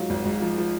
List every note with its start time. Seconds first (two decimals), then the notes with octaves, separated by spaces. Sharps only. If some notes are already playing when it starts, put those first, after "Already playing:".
Already playing: G#2 F#3 F4
0.10 G#1
0.25 G#2
0.42 F3
0.58 F3